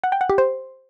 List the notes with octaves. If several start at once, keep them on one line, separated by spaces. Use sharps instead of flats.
F#5
G5
F#5
G4
C5